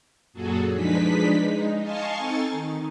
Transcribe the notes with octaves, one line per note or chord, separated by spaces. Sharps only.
F#2 A#2 F#3 F#4 G#4 A4
F3 G#3 D4 D#4 B4 B6
G#3 D#4
D#5 F5 G#5 A5 C6 C#6
C4 D#4 A4 G#5 C#6 A6
D#3